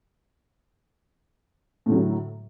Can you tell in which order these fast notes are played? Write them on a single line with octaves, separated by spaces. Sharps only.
A2 D3 F#3